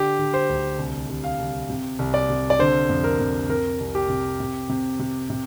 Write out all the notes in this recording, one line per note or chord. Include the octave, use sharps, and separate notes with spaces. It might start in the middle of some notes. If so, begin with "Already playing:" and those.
Already playing: D3 G4
D3
C5
D2
C2
C2
F5
C2
C3
C2
D5
C3
D5
D3 C5
F2
A#4
F2
C3 A#4
C2
G4
C3
C3
C3
C3
C3